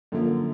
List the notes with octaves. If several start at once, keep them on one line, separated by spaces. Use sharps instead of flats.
F#2 D3 F3 A#3